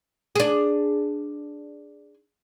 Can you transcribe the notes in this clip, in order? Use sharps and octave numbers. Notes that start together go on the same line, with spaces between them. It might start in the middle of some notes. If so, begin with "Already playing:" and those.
D4 G#4